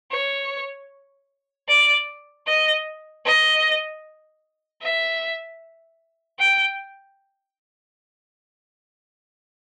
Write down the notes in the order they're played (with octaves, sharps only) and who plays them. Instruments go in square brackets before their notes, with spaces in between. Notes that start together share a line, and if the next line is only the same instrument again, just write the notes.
[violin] C#5
D5
D#5
D#5
E5
G5